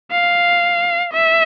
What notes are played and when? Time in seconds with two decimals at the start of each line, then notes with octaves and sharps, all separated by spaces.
0.11 F5
1.13 E5